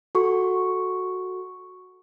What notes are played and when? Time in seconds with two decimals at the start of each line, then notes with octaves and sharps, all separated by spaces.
0.15 F#4 A4 C#6